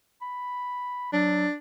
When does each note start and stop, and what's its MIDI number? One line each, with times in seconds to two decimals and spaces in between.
0.22 1.10 83
1.13 1.46 54
1.13 1.53 62